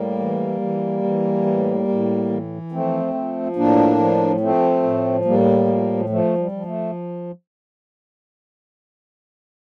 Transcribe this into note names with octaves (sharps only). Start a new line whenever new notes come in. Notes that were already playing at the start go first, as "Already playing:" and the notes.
Already playing: A2 G3 A#3
E3
E3
E3
A2
A2
E3
F3 A3 C4
F3
A2 A#3 D4
F3
F3 A3 C4
A2
A2 G3 A#3
F3
F3 A3
G3
F3
A3